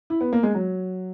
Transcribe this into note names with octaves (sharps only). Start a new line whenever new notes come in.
E4
B3
A#3
G#3
F#3